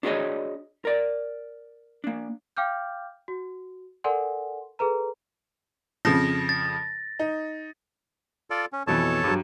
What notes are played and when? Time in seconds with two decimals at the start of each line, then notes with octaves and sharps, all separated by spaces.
0.03 D4 F#4 G#4 C5 C#5 D#5
0.85 A#4 D5
2.04 A#3 D4
2.57 F5 G5 D6 F6 G6
3.28 F#4
4.04 A4 A#4 D5 F#5 G#5 C6
4.79 G#4 A4 B4 A#5
6.05 F2 C#3 F3 A#6
6.49 A6
7.19 D#4
8.50 F4 A4 D5
8.73 C#4
8.87 F2 B2 E3 A4 C#5 A5
9.24 G2 F#3